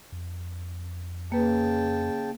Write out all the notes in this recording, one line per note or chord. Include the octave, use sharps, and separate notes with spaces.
F2
C#3 A#3 B4 G5 A5